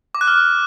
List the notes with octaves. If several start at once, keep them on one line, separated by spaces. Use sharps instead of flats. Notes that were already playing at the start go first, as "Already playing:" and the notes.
D6
F#6
F6